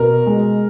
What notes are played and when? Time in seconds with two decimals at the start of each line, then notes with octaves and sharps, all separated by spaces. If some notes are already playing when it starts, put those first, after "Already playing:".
Already playing: B2 A#4
0.26 G#3